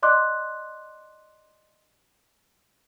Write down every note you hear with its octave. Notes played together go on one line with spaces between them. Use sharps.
D5 D#5 C6 D6 F#6